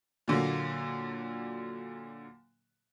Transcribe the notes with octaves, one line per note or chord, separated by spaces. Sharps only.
A#2 D3 F#3 A#3